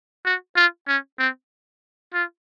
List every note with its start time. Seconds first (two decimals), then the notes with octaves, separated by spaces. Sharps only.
0.25 F#4
0.56 F4
0.88 C#4
1.19 C4
2.14 F4